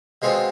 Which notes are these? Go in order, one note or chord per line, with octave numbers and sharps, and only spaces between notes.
B2 G#3 C4 F4